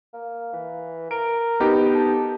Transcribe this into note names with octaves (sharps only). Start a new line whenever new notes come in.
A#3
E3
A#4 D7
B3 D#4 G4
A4